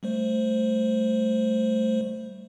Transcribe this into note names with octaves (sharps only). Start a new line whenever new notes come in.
G3 A3 C5